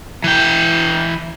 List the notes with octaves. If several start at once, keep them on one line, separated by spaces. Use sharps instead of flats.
E3 G5